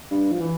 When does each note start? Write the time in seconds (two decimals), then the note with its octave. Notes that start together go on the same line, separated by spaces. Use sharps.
0.11 G2
0.32 F3
0.40 E3